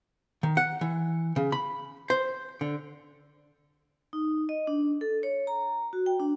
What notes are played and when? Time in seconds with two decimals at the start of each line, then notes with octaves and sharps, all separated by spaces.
0.43 D#3
0.57 F#5
0.81 E3
1.36 C#3
1.52 B5
2.10 C5
2.61 D3
4.13 D#4
4.49 D#5
4.67 D4
5.01 A4
5.23 C#5
5.47 A#5
5.93 F#4
6.06 G5
6.20 D4